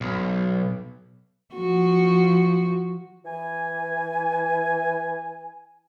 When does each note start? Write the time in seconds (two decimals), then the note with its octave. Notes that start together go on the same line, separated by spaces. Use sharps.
0.01 B1
1.54 F3 F#4
3.25 E3 G#5